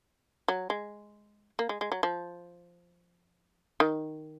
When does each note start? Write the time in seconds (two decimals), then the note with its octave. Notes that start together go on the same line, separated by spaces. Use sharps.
0.48 F#3
0.70 G#3
1.59 A#3
1.69 G#3
1.81 G#3
1.92 F#3
2.03 F3
3.80 D#3